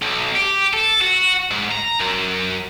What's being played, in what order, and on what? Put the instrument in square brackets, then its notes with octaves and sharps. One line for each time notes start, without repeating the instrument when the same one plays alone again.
[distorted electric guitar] B1
G4
A4
F#4
G#2
A#5
F#2